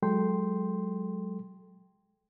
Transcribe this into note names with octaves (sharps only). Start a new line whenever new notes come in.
F#3 G#3 A4 G5 C6